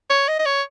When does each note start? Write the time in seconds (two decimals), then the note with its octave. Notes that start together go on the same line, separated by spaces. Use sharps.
0.10 C#5
0.28 D#5
0.39 D#5
0.46 C#5